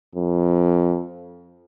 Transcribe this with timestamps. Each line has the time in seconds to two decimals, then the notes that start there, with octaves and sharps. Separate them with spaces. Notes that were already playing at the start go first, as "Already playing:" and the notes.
0.15 F2